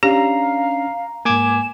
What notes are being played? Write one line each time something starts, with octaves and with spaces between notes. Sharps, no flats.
C#4 D4 G4 F5 A#5
G#2 A#3 G#5 D6 G#6 E7